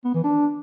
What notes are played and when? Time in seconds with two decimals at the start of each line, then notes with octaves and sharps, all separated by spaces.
0.05 B3
0.14 E3
0.24 D4